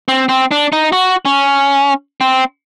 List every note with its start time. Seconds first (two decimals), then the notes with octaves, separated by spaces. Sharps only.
0.08 C4
0.29 C4
0.51 D4
0.73 D#4
0.93 F#4
1.25 C#4
2.21 C4